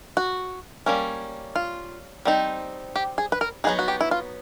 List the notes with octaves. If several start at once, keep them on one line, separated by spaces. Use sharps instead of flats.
F#4
G3 A#3 C#4
F4
G3 C4 D#4
G4
G#4
B4
A#4
F#3 B3 D#4 G#4
F#4
G4
E4
F4